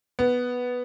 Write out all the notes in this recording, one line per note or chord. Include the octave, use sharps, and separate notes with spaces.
B3